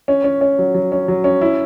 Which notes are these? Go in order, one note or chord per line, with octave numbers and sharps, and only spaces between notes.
C#4
C#4
C#4
F#3
F#3
C#4
F#3
C#4
E4